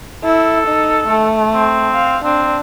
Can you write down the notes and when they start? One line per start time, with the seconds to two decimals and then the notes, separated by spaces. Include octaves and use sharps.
0.24 E4 A4
0.68 D#4
1.08 A3
1.54 C4
1.94 F5
2.25 C4 D4